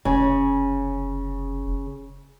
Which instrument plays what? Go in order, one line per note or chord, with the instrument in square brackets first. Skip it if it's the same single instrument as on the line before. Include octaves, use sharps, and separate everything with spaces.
[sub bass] F1 [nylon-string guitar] C#3 C#4